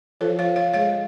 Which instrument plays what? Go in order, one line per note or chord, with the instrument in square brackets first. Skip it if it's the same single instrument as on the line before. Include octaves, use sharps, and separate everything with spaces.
[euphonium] F3 [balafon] A4 C#5
[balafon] C#5 F5
C#5 F5
[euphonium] G#3 [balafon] C#5 F5